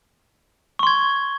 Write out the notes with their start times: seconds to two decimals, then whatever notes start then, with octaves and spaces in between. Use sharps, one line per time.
0.79 C#6
0.83 C6
0.87 G#6